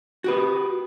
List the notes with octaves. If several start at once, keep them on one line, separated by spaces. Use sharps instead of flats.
F#4 G4 B4